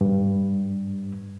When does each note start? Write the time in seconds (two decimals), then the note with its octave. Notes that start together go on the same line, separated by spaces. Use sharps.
0.01 G2